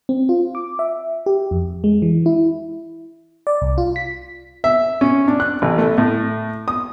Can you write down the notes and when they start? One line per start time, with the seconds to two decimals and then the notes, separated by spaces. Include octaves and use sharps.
0.09 C4
0.29 F4
0.55 D6
0.79 E5
1.26 G4
1.51 F2
1.84 G#3
2.02 E3
2.26 E4
3.47 D5
3.62 C2
3.78 F4
3.96 B6
4.64 E5
5.01 C#4
5.28 D4
5.40 F#6
5.62 A1
5.78 A3
5.98 A2
6.68 D#6